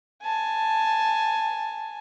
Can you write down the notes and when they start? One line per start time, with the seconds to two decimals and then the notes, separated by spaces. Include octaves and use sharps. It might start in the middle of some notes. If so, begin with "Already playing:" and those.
0.23 G#5 A5